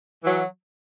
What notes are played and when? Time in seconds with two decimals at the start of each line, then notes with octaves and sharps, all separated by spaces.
0.24 E3 F#3